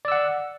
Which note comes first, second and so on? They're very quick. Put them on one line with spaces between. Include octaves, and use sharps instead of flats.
D5 E6 F#5